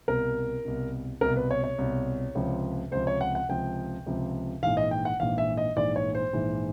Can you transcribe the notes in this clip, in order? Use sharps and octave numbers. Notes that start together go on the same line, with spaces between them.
C2 B2 A#4
C2 B2
C2 B2 A#4
B4
C#5
C#5
C2 B2
C#2 C3 F3
C#2 C3 F3 C5
C#5
F#5
F#5
C#2 C3 F3 G5
C#2 C3 F3
A#1 G#2 E3 F5
D#5
G5
F#5
A#1 G#2 E3 F5
E5
D#5
A#1 G#2 E3 D5
C#5
C5
A#1 G#2 E3